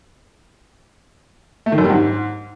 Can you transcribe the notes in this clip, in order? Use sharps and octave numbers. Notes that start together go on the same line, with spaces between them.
A3
D#3
F#2
G3
G#2